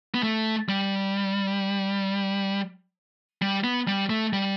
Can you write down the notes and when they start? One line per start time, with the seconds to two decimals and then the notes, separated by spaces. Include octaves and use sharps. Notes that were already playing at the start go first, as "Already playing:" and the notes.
0.14 B3
0.23 A3
0.69 G3
3.42 G3
3.64 B3
3.88 G3
4.10 A3
4.33 G3